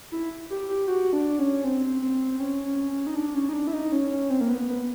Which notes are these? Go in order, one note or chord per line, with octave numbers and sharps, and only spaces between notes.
E4
G4
G4
F#4
D4
C#4
C4
C4
C#4
C#4
C#4
D#4
D4
C#4
D#4
D4
E4
D#4
C#4
C#4
C4
A#3
B3
B3